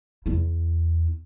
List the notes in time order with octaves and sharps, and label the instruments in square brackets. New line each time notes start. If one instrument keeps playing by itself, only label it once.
[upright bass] E2 E4